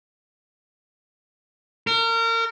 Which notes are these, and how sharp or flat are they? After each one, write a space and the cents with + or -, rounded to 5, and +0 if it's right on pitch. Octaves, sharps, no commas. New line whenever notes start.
A#4 -30